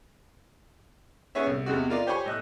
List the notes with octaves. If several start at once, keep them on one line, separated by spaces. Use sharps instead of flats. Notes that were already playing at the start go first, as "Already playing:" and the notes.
B3 C#4 G#4 C#5 E5
C2
E2 C3 G#3 F#4
F4 A#4 D5 D#5 F5
G4 C5 C#5 G#5 B5 C#6
A2 D#5 F#6